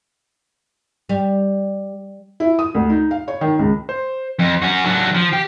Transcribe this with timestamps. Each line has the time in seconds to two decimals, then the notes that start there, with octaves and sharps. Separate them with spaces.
1.09 G3
2.40 E4
2.59 D#6
2.75 D2
2.90 D#4
3.11 F5
3.28 C#5
3.41 D#3
3.59 C#2
3.89 C5
4.39 F2
4.62 C#4 F#4
4.85 F#3 D4
5.15 F3
5.33 G4